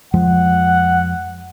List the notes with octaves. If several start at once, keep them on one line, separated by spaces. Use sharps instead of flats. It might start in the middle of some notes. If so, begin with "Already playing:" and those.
F2 F3 G#3 F#5